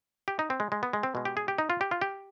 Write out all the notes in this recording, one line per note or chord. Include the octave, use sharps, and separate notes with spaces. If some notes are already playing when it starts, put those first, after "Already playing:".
G4
D#4
C4
G#3
G#3
B3
G#3
C4
B2 G#3
G4
G#4
G4
D#4
F4
G4
F4
G4